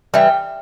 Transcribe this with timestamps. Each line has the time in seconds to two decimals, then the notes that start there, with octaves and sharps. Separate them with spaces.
0.14 E3 G3 G5